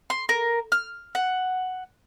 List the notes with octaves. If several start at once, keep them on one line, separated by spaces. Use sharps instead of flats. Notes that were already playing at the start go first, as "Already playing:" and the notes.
C6
A#4
F6
F#5